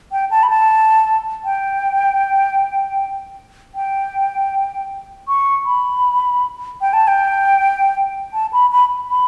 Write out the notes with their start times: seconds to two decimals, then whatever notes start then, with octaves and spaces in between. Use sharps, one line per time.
0.12 G5
0.31 A5
0.43 B5
0.50 A5
1.45 G5
3.75 G5
5.28 C#6
5.66 B5
6.81 G5
6.93 A5
7.08 G5
8.33 A5
8.53 B5
8.72 B5
9.10 B5